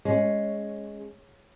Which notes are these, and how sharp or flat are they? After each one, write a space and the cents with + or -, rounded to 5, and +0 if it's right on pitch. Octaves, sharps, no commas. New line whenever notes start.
G#3 +0 C#4 +0